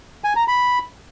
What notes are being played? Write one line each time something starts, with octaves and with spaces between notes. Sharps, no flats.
G#5
A#5
B5